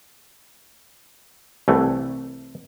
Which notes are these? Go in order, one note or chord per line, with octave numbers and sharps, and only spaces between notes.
C2 E3 A3